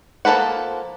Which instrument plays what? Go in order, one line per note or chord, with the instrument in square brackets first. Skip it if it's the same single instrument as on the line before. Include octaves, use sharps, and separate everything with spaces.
[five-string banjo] F3 A#3 A4 B4 F#5